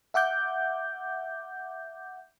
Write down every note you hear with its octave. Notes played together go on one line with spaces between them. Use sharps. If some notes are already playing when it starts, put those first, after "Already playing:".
E5 F#5 D6 G6